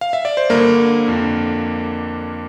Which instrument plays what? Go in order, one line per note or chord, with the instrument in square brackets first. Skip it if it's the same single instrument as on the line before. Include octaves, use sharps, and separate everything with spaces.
[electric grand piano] F5
E5
D5
C5
G2 D3 A#3 A#4
F2 D3